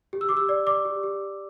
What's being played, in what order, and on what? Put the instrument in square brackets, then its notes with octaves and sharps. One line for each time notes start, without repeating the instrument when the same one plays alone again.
[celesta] G4
E6
G4 D6
E6
D5
D5 D6
G4
G4